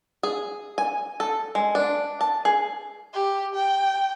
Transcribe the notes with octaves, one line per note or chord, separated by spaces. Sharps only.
G#4
G#5
A4
G#3
D4
A5
G#4
G4
G5